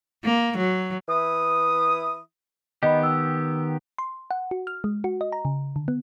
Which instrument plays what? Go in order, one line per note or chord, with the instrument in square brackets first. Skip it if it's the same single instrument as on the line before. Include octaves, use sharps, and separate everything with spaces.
[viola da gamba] A#3
F#3
[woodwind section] E3 E4 D#6
[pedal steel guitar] D#3 B3 G4 [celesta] D#5 B5
[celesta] E6
[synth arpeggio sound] C6
F#5
F#4
F6
G#3
F#4
D#5
A#5
C#3
D3
B3